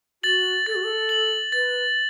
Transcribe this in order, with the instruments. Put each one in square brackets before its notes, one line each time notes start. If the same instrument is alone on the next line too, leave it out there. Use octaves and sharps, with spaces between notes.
[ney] F#4 [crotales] A6 F#7
[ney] A4 [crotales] A6
[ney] F#4
A4
[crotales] F#7
[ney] B4 [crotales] A6